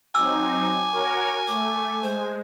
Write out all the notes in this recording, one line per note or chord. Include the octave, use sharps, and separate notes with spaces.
F#3 C4 D#4 G#5 D6 E6
F#4 A#4 C#5
A3 D6
G#3 C5